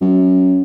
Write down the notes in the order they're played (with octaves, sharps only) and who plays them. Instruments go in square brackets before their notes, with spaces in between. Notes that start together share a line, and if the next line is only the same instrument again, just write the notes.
[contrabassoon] F#2